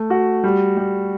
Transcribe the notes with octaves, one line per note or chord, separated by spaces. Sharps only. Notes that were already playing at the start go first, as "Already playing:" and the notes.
Already playing: A3
F#4
G3
G3